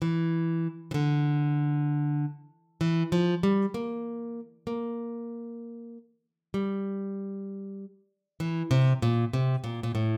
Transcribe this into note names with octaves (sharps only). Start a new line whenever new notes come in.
E3
E3
D3
E3
F3
G3
A#3
A#3
G3
E3
C3
A#2
C3
A#2
A#2
A2